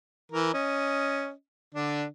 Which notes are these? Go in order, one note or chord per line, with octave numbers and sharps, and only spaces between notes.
E3 A#4
C#4 D#5
D3 D4